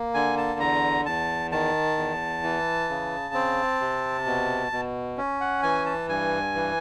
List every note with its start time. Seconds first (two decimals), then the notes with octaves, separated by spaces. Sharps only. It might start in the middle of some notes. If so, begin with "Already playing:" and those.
Already playing: A#3
0.14 D3 G#5
0.38 A5
0.60 E2 A#5
1.06 E2 A5
1.52 D#3 A5
1.97 E2
2.43 E3
2.89 C#3
3.34 C4
3.81 C3
4.26 B2
4.72 B2
5.18 C#4
5.40 F#5
5.63 E3 G#5
5.86 A5
6.09 G2 G#5
6.55 E3